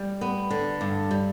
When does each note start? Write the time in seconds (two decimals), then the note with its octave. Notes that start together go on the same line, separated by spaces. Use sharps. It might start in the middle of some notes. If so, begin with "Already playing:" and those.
Already playing: G3
0.21 B3
0.50 D3
0.81 G2
1.11 G3